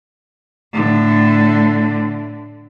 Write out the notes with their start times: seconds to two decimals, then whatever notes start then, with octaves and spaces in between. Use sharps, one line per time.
0.73 A2 D3